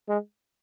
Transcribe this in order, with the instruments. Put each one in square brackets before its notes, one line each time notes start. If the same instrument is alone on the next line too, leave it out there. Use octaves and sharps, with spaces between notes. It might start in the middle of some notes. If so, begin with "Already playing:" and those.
[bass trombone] G#3